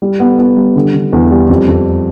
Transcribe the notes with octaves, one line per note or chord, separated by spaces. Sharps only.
G3
B3
B3
G3
D3
D3
E2
G3
F2
F2